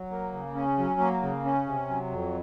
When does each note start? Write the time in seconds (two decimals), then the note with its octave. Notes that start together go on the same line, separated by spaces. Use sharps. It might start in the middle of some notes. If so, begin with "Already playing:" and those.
Already playing: F#3
0.11 A#3
0.33 C#3
0.55 C#4
0.78 F#3
1.00 A#3
1.22 C#3
1.45 C#4
1.67 C3
1.90 F#3
2.11 F2